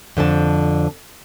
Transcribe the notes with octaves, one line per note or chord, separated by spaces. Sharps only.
F2 D3 C4 A5